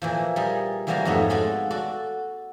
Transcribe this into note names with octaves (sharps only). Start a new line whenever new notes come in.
A#2 E3 F3
G3 G#4 A#4
E3 F3 G3 A#3 F#4 A#5
F2 G#2 A3 B3 C#5
G#3 F4 F#4 A4 C#5 D5
F#4 A4 D5